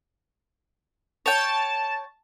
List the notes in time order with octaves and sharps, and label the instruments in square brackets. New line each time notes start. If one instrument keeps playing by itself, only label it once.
[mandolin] C#5 G5 [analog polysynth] A5